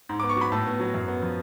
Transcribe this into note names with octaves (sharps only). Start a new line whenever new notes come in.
G#2
D6
B3
C#6
F#3 B5
A2 A5
B3
F#3
F#2
B3
F3